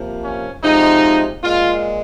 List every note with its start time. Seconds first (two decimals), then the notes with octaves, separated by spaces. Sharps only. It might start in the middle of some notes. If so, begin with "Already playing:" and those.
Already playing: C3 F3 A#3
0.23 C#4
0.62 C3 F3 G#3 D#4
1.42 A#2 G#3 F4